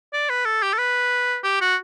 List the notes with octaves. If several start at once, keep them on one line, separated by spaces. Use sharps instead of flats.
D5
B4
A4
G4
A4
B4
G4
F#4